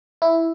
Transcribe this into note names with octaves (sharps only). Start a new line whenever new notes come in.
E4